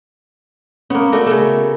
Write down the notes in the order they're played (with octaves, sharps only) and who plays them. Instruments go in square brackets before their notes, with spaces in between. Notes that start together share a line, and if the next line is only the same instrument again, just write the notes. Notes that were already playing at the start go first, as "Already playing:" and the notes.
[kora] A#3 B3 [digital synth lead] C#4
[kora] A3 D4 F#4 [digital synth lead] A#4
[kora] C#3 A3